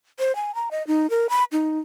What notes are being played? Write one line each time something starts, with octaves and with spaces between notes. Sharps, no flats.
C5
G#5
A#5
D#5
D#4
A#4
B5
D#4